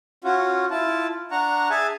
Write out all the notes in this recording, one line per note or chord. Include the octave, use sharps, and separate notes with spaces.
C#4 F4 F#4
E4 F4 A5
D4 F#5 A#5 C#6
G#4 E5 G#5 A5